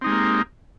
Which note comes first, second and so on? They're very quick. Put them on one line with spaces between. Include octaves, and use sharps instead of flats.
C4 D#4 G#3 G4 A#3